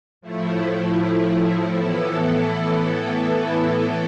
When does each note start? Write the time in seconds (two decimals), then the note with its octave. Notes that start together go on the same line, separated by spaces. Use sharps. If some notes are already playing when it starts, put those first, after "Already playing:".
0.21 A2 F3 A3 E4
1.74 A2 E3 B3 E4 A4